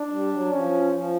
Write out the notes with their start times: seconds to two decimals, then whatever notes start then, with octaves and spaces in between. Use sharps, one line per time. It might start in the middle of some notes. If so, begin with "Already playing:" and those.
Already playing: D4
0.12 G3
0.32 F#3
0.52 F3 C#4
0.93 F3